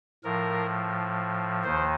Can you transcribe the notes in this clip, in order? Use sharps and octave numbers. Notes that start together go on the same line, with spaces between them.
A2 F3 A#4
D#2 D#3 C5